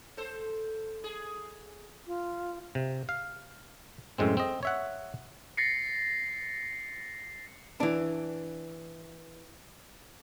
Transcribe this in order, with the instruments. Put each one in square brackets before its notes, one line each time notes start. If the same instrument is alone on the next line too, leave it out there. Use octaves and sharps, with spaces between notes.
[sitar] A4 C5
G#4
[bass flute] F4
[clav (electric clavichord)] C3
F5
F#2 A2 G#3 C4
C4 D#5
C#5 E5 F#5
[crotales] A6 A#6 C7 C#7
[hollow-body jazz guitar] E3 D4